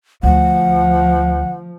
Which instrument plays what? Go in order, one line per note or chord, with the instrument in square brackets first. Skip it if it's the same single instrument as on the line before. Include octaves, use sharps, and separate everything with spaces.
[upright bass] D2 [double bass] F3 [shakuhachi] F#5